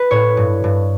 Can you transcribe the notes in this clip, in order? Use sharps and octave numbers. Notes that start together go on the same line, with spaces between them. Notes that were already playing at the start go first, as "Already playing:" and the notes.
Already playing: B4
A2 C#5
G2
G2